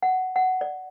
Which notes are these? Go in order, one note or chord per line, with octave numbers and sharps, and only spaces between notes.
F#5
F#5
D5